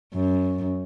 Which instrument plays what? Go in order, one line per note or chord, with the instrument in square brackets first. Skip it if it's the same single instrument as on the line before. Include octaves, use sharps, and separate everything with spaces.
[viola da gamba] F#2